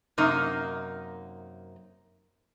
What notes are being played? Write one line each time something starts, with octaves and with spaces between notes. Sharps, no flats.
F#2 C3 A#3 D#4